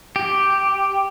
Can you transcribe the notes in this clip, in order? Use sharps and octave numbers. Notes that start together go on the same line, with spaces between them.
G4